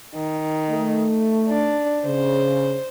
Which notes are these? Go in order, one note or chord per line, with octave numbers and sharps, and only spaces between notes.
D#3
A3
D4
C#3 C5